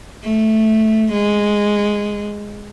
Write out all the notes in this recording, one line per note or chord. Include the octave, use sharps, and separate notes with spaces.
A3
G#3